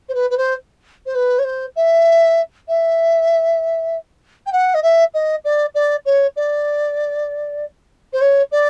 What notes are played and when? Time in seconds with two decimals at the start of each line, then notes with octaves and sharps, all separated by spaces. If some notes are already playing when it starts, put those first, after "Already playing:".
0.09 C5
0.14 B4
0.30 B4
0.37 C5
1.06 C5
1.15 B4
1.39 C#5
1.44 C5
1.76 E5
2.68 E5
4.46 G5
4.52 F#5
4.74 D#5
4.83 E5
5.14 D#5
5.44 D5
5.75 D5
6.05 C#5
6.36 D5
8.13 C5
8.21 C#5
8.51 D5